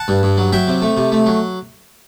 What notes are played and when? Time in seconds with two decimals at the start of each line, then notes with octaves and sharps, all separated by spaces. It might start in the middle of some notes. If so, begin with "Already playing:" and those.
Already playing: F#5 A5
0.08 G2
0.23 G2
0.37 F#3
0.52 F#3 E5 G5
0.67 C3
0.82 A3
0.97 C3
1.12 A3
1.26 F#3